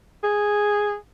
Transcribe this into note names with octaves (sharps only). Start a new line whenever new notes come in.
G#4